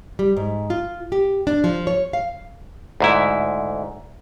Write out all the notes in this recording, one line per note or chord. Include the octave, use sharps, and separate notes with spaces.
G3
G#2
F4
G4
D4
F3
C#5
F5
D2 G#2 E4